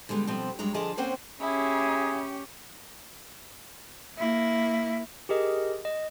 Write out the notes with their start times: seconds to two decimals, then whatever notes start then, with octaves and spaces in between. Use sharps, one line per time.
0.09 D3 G3 G#3 B3
0.27 B2 F3 G3 C4
0.59 G2 F#3 G#3 C#5 A#5
0.74 D3 F3 G#4 D#5 A5
0.97 A#3 C4 C#4 C5 F#5 G5
1.41 C#4 E4 G4 G#4
4.17 A#3 E4
5.29 G4 G#4 A#4 D#5
5.85 D#5